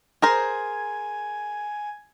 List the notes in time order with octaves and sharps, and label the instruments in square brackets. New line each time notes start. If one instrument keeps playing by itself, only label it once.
[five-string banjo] G#4 A#4 C5 [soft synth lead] G#5